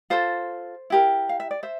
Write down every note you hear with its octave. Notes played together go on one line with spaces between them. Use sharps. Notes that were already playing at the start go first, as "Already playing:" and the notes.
F4 A4 C5
E4 G4 A#4
F5
E5
D5
C5 E5